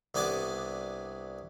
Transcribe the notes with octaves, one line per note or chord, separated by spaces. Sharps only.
C2 B3 D4 G#5 A5 D6